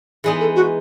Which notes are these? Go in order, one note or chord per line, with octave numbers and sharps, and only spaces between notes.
E3 G#3 B3 D#4 G#4
A4
F#4